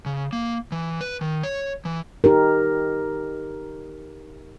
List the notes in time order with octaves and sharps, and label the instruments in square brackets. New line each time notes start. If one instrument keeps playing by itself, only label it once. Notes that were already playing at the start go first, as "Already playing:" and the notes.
[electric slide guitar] C#3
A#3
E3
B4
D#3
C#5
E3
[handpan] D#4 G4 A#4